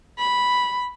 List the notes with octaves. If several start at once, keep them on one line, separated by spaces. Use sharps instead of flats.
B5